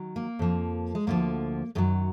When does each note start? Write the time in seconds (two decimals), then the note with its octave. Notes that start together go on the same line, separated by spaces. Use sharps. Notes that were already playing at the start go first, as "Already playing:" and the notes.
Already playing: D#3 F#3
0.16 A#3
0.39 F2 F3
0.95 G#3
1.07 D2 D3 F3 A#3
1.75 F#2 D#3 F#3 G#3